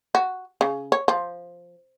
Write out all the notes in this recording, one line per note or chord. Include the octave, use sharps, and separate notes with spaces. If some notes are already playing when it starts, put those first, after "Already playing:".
F#4
C#3
C#5
F3